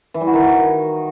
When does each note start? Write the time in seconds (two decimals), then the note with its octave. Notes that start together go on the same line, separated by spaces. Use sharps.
0.14 E3
0.21 G3
0.27 F#4
0.33 D#3